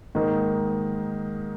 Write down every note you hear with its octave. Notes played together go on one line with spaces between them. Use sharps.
G#2 D#3 A#3 D#4